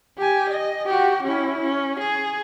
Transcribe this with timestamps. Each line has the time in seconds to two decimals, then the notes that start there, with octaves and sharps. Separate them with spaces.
0.18 G4 G#5
0.50 D#5
0.85 F#4 G4
1.24 C#4 E4
1.61 C#4
2.00 G#4